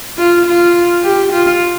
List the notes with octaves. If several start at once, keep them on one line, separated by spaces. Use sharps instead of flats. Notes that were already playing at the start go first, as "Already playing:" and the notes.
F4
F4
G4
F4